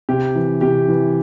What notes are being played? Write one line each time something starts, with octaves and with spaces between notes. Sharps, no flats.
C3 G4
E3
C3 G4
E3